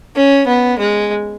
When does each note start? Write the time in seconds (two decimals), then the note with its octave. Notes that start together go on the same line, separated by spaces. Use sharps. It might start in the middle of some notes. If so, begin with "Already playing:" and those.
0.16 C#4
0.48 B3
0.79 G#3